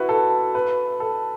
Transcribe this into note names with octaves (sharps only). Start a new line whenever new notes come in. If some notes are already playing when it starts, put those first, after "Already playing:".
Already playing: E4 F#4 B4
A4
B4
A4